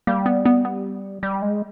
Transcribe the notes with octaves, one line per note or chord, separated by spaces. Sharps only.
G3 A#3
B3
B3
B3
G3
G#3